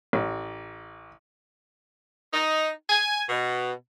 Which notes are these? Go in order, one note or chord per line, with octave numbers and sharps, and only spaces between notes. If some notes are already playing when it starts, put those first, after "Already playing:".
A1
D#4
G#5
B2